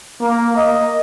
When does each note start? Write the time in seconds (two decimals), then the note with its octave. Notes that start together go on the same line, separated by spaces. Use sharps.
0.22 A#3
0.57 D#5